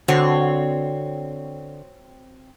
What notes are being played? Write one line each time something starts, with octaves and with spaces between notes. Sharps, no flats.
D3 C4 F#4 C#5 F#5